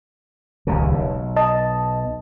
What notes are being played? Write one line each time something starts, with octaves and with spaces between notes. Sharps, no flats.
D#1 C#2 C#3
B1
D#5 A5